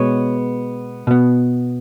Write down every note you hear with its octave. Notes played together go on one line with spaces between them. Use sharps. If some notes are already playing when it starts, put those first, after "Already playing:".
Already playing: B2 G#3 B3 C#5
B2 B3